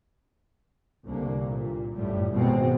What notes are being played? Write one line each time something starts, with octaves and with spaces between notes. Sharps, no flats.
C2 D3 A#3
A#2
G1 F#2 A2 G3
G#1 G#2 B2 G#3 B3 C4